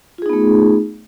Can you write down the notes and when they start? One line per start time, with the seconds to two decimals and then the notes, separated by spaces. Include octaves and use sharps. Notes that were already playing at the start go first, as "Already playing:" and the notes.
0.18 F4
0.22 G#4
0.26 D#4
0.29 B3
0.33 A3